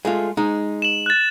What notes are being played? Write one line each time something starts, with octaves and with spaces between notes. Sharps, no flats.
G#3 A3 F4
G#3 D#4
E7 F#7
F#6 A6